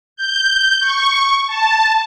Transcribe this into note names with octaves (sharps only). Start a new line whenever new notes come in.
G6
C#6
A5